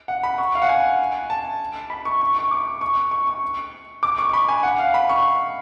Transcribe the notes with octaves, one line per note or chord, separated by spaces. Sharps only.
F#5
B5
C#6
F5
F#5
G#5
A5
B5
C#6
C#6
C#6
D6
C#6
C#6
C#6
D6
C#6
C#6
B5
G#5
F#5
F5
B5
C#6